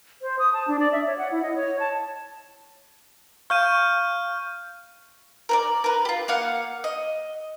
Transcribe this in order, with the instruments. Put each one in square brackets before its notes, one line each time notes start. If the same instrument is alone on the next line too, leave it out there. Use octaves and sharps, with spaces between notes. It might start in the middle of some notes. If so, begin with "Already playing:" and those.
[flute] C5
D#6
A5
D4
D5
E5
C#5
F#5
E4
D#5
C#5
A5
[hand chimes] F5 C#6 [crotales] F6 G6 D#7
[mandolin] A#4 B4 D5
A#4 B4
F4 G4
A#3 F5 F#5
D#5